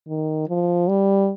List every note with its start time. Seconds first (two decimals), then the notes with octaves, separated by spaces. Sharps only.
0.08 D#3
0.49 F3
0.89 G3